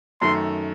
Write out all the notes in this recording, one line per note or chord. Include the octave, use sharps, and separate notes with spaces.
F#2 D#3 A3 C6